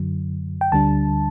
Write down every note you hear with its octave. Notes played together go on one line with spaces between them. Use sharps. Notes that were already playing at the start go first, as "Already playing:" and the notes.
Already playing: F#2 D3 F#3
G5
D2 D3 G3 D4 A5